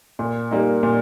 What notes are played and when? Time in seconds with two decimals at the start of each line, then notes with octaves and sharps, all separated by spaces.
0.19 A#2
0.51 G3 A#3 D#4
0.83 A#2